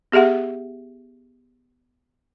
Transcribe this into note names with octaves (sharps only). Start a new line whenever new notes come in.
B3 G4 G#4 E5 F#5